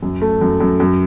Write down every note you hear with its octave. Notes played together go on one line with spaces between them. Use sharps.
F#2
A3
F#2
F#2
F#2